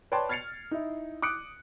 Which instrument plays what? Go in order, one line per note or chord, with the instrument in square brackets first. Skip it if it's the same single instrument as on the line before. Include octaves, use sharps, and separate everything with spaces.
[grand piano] B4 C#5 D5 G5 A5 C6
F6 G#6 A6 C7 C#7 F7
D#4 E4
D6 D#6 F#6 C#7 D7